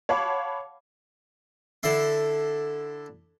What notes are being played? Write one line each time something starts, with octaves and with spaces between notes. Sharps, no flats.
C#5 F5 F#5 A5 B5 D6
D3 E4 C6